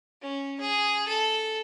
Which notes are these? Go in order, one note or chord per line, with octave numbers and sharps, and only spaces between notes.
C#4
G#4
A4